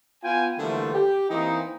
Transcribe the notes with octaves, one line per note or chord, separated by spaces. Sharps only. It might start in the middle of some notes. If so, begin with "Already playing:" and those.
B3 F4 G5 G#5
D3 E3 F3 G3 A3 A#3
G4
E3 A#3 C4 D#4